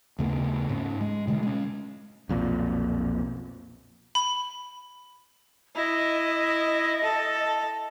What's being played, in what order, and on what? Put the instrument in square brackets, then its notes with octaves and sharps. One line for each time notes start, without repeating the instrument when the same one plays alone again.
[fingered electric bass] D#2 C#3 A3 B3
G#2 C#4
G#3
B2 D3 D#3 G#3
G#3 C#4
B1 F2 A#2
[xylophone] B5
[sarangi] E4 [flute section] D#5
[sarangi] A4